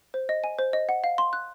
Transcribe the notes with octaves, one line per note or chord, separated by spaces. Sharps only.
C5
D#5
G#5
C5
D#5
F#5
F5
C6
F#6